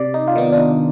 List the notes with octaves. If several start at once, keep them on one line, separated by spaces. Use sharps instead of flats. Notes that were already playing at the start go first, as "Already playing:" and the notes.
Already playing: C3 D5
D#4
F4
D#3 B3 D#4
D4
D#4